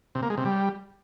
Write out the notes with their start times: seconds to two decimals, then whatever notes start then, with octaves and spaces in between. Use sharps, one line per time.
0.15 C3
0.23 A#3
0.30 G#3
0.38 C3
0.45 G3